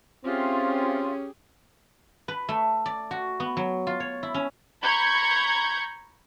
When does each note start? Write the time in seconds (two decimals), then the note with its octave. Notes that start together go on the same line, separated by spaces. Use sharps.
0.24 C4 C#4 F4 G4 G#4 E5 C6
2.28 B4
2.49 A3
2.86 D5
3.11 F#4
3.40 B3
3.57 F#3
3.87 F4
4.00 C#5
4.23 E4
4.34 C#4
4.83 A#5 B5 C#6 G6 G#6